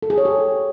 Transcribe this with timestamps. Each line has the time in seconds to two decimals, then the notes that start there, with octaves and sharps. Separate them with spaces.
0.03 A4
0.10 G#4
0.18 C#5
0.25 G4